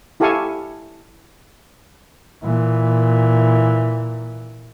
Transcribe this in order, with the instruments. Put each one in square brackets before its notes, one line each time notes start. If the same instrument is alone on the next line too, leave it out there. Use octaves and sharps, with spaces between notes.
[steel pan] E4 G4 A4 F5 G#5 C#6
[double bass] A#2 E3